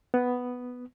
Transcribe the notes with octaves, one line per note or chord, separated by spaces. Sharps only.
B3